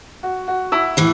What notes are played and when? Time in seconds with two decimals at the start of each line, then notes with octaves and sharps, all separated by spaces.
0.23 F#4
0.48 F#4
0.72 E4
0.97 A2 E3